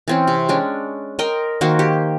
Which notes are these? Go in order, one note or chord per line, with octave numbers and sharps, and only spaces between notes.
E3 C4 C#4
C3
G#3 C#4 D4
A#4 D#5 G5 C6
D#3 A#3 F#4 C5
G4